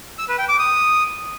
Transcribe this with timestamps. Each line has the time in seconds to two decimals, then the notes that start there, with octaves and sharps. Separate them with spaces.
0.18 E6
0.29 B4
0.39 G5
0.49 D6
0.59 D#6